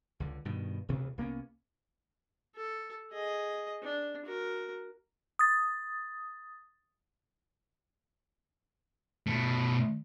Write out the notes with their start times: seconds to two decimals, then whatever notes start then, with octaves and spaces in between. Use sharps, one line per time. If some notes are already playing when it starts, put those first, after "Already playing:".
0.20 C#2 D3
0.45 G2 B2 D#3
0.89 E1 D2 C3 E3
1.18 C2 A#3 B3 C#4
2.55 A4
3.11 G#4 D#5
3.82 D4
4.25 F#4 A#4
5.39 D#6 A6
9.27 B2 A3